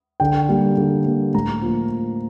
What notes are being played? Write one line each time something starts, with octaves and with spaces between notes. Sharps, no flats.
D3 G5
G3 A#3
D3
G3 A#3
A2 A#5
F3 A#3